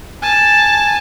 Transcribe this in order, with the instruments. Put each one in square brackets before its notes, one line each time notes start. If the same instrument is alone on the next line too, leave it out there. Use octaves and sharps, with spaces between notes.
[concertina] G#5 [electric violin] A5